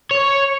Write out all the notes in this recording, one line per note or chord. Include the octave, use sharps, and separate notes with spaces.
C#5